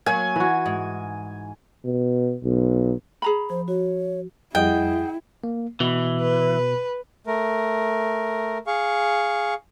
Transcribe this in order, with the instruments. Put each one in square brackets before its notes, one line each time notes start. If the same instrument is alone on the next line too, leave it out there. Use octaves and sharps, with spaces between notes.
[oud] F#3 A#3 [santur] G#5
[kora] E3 F#4
[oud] G#2
[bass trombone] B2
B1
[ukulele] G#4 A#5 B5
[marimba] F3 [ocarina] C5
[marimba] F#4 [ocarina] C#5
[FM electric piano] F2 G3 D#6 [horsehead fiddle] E4 [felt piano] G#4 D#5 F#5 [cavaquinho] G5
[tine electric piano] A#3
[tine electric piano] B2 [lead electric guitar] E3
[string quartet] B4
[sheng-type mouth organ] A3 A#4
G#4 F5 C#6